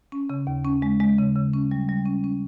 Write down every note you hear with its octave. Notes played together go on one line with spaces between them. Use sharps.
C#4
C#3
D#2
C#4
G#3
G#3
C#3
C#3
C#4
G3
G3
C#4
C#4